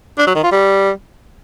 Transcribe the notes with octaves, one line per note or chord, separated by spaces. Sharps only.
D4
F#3
D#3
F4
G3